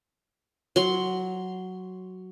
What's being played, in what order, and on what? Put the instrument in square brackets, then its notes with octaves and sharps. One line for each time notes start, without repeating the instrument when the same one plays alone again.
[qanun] F#3 C6